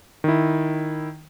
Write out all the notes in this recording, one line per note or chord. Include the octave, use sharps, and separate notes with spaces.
D#3 E4